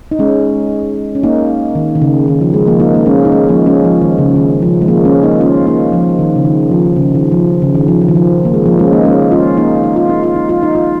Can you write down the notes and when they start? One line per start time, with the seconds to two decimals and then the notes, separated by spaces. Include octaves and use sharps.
0.11 D#4
0.19 G#3 C#4
1.15 C#4
1.23 A#3 D#4
1.75 D#3
1.95 D#3
2.02 C#3
2.28 D#3
2.41 F3
2.54 G#3
2.67 F3 A#3
2.80 A#3 D#4
2.94 A#3
3.06 G#3 C#4
3.25 D#4
3.32 G#3 C#4
3.49 F3 A#3
3.66 G#3 C#4
3.84 F3
4.01 D#3
4.18 C#3
4.36 D#3
4.62 F3
4.82 G#3
4.88 F3 A#3
5.05 G#3 C#4
5.23 A#3 D#4
5.40 C#4 F4
5.67 A#3 D#4
5.93 F3
6.19 D#3
6.36 C#3
6.45 D#3
6.71 F3
6.96 C#3
7.15 D#3
7.32 F3
7.62 C#3
7.75 D#3
7.88 F3
8.01 F3
8.08 D#3
8.15 F3
8.45 A#3
8.54 G#3
8.66 F3 A#3
8.79 G#3 C#4
8.92 A#3 D#4
9.05 G#3 C#4
9.31 C#4 F4
9.57 A#3 D#4
9.84 D#4
9.96 F4
10.10 D#4
10.23 F4
10.36 D#4
10.49 F4
10.63 D#4
10.75 F4